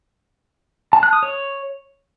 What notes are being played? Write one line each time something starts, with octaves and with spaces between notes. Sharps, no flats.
A5
F#6
D#6
C#5